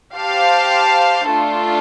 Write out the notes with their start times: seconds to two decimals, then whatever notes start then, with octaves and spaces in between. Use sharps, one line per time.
0.14 G4 C5 F5 A5
1.29 A3 D4 F4 A4